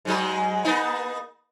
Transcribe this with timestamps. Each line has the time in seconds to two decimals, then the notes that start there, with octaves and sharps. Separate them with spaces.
0.05 G#2 F#3 G#3
0.65 A#3 B3 D#4